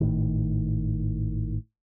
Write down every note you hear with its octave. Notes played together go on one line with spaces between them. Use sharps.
G#1 A2 D#3